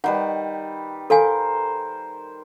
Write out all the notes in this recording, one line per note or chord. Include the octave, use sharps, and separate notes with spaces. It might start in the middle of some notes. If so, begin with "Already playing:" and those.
D#3 G3 B4 F#5
A4 A#4 C5 F5 G#5